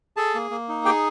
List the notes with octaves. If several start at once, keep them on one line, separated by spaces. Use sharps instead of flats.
G#4 A4 A5
A#3
A#3
D#4
G4 G#4 G5